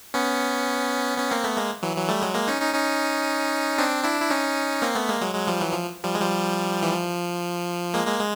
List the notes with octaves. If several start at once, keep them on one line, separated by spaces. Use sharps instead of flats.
B3 C#4
B3 C#4
A#3 C4
A3 B3
G#3 A#3
E3 F#3
E3 F#3
G3 A3
F#3 G#3
G#3 A#3
C#4 D#4
C#4 D#4
C#4 D#4
C4 D4
D4 E4
E4
C#4 D#4
A#3 C4
A3 B3
G#3 A#3
F#3 G#3
F#3 G#3
F3 G3
E3 F#3
F3
F3 G3
G#3
F3 G3
E3
F3
G#3 A#3
G#3 A#3
G#3